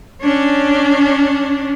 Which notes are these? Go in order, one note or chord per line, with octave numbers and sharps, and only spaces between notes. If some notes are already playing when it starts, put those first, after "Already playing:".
C#4 D4